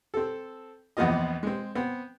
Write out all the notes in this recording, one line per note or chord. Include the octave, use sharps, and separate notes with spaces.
C4 A4
A#1 E2 B3 C4 F4 D#5
G#3 C4
B3 C4